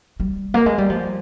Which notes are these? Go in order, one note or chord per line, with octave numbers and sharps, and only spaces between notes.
G3
A#3
G#3
G3
F3